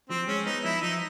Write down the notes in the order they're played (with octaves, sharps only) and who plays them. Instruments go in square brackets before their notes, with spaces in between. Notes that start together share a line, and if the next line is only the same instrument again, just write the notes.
[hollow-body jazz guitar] F3 [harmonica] C4
[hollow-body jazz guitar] G#3 [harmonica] C#4
[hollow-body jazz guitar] B3 [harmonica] D#4
[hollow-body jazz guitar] F3 [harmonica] E4
[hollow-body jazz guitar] F3 [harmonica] D#4